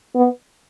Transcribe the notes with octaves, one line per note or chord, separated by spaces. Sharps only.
B3